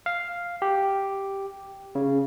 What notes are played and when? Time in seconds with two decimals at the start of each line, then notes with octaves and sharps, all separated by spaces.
0.06 F5
0.62 G4
1.95 C#3